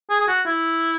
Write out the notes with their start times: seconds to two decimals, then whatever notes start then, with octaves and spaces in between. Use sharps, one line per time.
0.10 G#4
0.20 G#4
0.28 F#4
0.46 E4